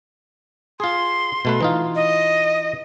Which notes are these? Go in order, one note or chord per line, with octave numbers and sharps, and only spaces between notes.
F4 G#4 C6
B2 A3 B4
E3 D#4 F4
D#5